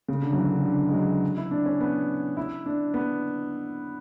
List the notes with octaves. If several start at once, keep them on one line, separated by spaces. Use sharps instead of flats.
C#3
D3
F#3
E3
D3
D3
G#3
F#3
E4
D4
C#4
B3
E4
D4
B3